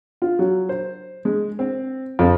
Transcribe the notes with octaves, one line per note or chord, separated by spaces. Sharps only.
F4
F#3
C5
G#3
C4
F2